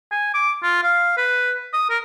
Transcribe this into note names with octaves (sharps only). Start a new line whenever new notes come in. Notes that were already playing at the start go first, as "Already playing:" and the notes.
G#5
D6
F4
F5
B4
D#6
A#4